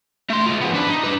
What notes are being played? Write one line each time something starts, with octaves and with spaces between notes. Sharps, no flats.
A3 C6
G#3 F4
F3 B3
D4 B4
D#4
D4 B4